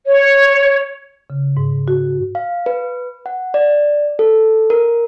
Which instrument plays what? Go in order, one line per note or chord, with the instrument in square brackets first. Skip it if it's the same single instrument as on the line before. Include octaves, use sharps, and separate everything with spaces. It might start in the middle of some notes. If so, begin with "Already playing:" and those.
[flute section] C#5
[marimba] C#3
G#2
F#4
[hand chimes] F5
B4
F#5
D5
A4
A#4